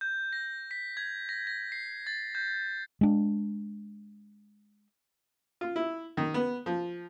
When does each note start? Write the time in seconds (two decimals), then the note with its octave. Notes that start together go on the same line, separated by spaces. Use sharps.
0.01 G6
0.33 A#6
0.71 B6
0.97 G#6
1.29 A#6
1.47 A#6
1.72 C7
2.07 A6
2.35 G6
3.01 G#3 D4
5.61 F4
5.76 E4
6.17 D#3
6.34 B3
6.66 F3